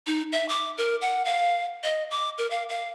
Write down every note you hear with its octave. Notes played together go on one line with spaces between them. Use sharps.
D#4
E5
D6
A#4
F#5
F5
D#5
D6
A#4
F5
F5